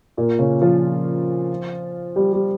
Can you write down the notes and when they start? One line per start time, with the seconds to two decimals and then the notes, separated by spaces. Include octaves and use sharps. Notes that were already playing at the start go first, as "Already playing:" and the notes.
0.17 A#2 A#3
0.39 C#3 C#4
0.61 F3 F4
2.16 G3 G4
2.33 G3 G4